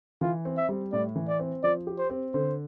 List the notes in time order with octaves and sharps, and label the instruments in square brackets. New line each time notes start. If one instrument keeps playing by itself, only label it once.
[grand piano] E3 [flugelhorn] F4
[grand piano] C4
[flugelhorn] E5
[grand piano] G3
[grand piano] A2 [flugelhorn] D5
[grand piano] E3
[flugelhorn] D5
[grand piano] C4
[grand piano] F3 [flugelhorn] D5
[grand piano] G4
[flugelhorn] C5
[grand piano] C4
[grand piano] D3 [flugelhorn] C5